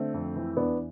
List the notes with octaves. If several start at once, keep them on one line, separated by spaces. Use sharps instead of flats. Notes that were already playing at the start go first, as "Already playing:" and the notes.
Already playing: D3 A3 C4
F2
E3
E2 B3 D4